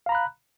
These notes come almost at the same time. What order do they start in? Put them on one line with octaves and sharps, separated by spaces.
F5 A#5 B5 F#6